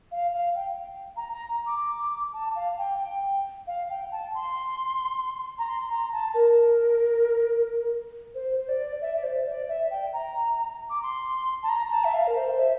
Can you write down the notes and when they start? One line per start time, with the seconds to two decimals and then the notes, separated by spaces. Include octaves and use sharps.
0.11 F5
0.33 F5
0.55 G5
1.16 A#5
1.33 A#5
1.66 D6
2.00 D6
2.33 A5
2.56 F5
2.78 G5
3.00 G5
3.67 F5
3.90 G5
4.12 A5
4.34 C6
5.58 A#5
5.68 C6
5.89 A#5
6.13 A5
6.34 A#4
8.35 C5
8.59 C5
8.68 D5
9.02 E5
9.16 D5
9.23 C5
9.46 D5
9.68 E5
9.91 G5
10.13 A#5
10.90 D6
11.03 C6
11.63 A5
11.69 A#5
11.91 A5
12.04 E5
12.14 F5
12.27 A#4
12.36 C5
12.59 E5